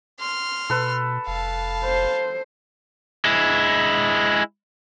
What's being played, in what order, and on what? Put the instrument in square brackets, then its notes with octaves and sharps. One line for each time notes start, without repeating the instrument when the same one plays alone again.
[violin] C6 F6
[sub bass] B2 [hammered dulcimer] A4 B4
[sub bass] F1 [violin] F5 A5
[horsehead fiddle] C5
[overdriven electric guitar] G#3 E4